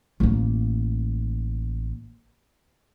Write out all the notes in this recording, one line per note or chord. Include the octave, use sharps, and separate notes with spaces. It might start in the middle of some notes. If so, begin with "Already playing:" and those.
A1 A#3